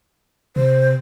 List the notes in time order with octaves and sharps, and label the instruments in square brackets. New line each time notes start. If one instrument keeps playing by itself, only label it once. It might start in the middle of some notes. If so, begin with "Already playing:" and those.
[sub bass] C3 [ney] C5